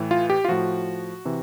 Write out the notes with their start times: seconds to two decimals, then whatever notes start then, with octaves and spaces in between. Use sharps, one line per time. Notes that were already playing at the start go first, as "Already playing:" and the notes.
Already playing: A2 E3
0.11 F4
0.30 G4
0.45 F4
0.49 A2 F3 F#4
1.25 C3 E3